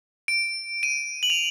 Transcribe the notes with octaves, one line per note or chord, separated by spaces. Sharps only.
D7
D#7
F#7
F7